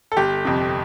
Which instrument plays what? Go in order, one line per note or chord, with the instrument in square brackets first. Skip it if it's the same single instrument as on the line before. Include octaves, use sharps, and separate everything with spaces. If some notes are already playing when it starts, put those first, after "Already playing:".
[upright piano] A4
G1 G4
F2 C3